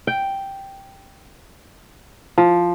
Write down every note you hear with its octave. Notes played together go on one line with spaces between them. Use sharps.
G5
F3